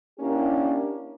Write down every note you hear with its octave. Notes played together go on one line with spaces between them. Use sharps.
A#3 C#4 D4 E4 G4